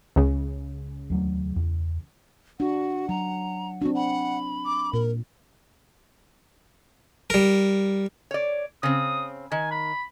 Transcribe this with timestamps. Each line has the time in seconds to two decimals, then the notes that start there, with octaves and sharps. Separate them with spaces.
0.16 C#2 C#3
1.10 D#2 F#3 A3
1.56 E2
2.60 D4 F#4 F#5
3.09 F#3 A#5
3.82 C4 D4 F#4
3.95 F#5 B5
4.66 D6
4.93 A#2 A#4
7.30 G3 A#4
8.31 C#5 D5
8.83 C#3 C4 D#6
9.52 D#3 G#5
9.71 B5